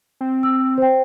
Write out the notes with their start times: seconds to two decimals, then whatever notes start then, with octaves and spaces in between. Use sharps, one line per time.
0.21 C4
0.43 E6
0.78 C5 G5